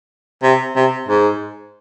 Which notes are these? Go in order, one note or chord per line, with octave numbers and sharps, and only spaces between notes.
C3
C3
G#2